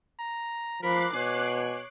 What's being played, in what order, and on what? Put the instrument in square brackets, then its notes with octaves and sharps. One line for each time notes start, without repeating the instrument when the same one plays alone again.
[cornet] A#5
[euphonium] F3 [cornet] A#4 [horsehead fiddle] B5 [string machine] D6 F#6 C7
[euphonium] B2 [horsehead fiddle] C#5 [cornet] G#5